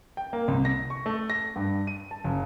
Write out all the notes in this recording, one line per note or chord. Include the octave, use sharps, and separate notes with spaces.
G5
A#3
C2
A#6
C#6
A3
A#6
G2
D#7
A5
F#1